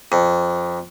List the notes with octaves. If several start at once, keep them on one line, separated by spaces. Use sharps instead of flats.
F2